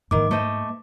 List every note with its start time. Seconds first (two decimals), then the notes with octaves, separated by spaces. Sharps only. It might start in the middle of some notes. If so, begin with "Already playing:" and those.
0.11 G#2 D#3 E3 A#3 D6
0.31 A3 C5 D#5